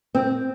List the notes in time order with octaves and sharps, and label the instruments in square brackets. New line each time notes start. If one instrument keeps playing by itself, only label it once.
[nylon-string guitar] C4